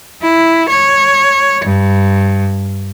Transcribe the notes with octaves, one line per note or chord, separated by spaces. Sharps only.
E4
C#5
G2